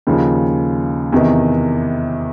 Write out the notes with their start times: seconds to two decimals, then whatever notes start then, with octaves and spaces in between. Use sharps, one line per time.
0.07 D#2 C#3 F3
1.12 E2 C3 D#3